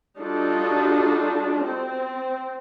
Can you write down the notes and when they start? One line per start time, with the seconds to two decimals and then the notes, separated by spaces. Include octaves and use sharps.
0.18 G3 D4 D#4 F4 F#4 A4
1.65 C4